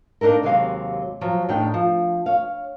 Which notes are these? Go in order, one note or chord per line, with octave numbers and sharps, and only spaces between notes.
A#3 D4 D#4 A4 A#4
D#2 C3 F#3 G#3 F5 G#5
F3 F#3
E2 A2 G3 D4 D#4 G5
F3
C#5 F5